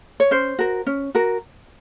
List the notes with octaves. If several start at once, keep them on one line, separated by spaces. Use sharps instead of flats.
C#5
C#4 C5
F#4 A#4
C#4
F#4 A#4